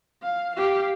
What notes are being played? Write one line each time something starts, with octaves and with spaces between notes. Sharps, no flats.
F5
G4 F5